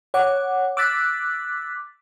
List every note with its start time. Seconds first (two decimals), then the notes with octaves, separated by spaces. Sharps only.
0.14 C#5 F#5 D6
0.77 D6 E6 F#6 A6 B6